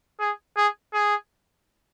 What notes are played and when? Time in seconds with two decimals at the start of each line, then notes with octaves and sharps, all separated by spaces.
0.20 G#4
0.56 G#4
0.93 G#4